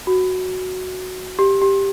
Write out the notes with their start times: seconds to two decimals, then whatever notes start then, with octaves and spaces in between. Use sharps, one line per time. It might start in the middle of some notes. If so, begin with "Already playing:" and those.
0.07 F#4
1.39 G4
1.62 G4